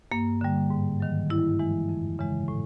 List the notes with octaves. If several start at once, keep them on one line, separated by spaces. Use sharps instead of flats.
G2 A#3
D3 G3
G#2
D#3 F#3
G2 E4
E3 G#3
F2
C#3 E3 G#3
A2